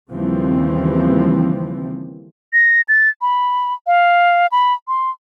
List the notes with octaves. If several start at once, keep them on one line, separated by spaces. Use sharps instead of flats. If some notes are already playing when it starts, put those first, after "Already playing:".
D#2 C#3 E3 F3 G3 C4
A#6
A6
B5
F5
B5
C6